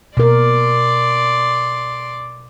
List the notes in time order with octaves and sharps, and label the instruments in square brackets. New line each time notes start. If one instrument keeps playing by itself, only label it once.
[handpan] B2 A#4 [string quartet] D5 C6 D6